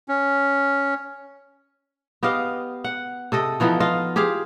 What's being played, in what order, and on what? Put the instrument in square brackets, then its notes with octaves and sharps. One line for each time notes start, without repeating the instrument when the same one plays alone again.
[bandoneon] C#4
[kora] B3 G4 D#5 F5
F#5
C3 A4 D#5
E3 F3 B3 D#4
F4 D#5 F5
G4 G#4 C5 F5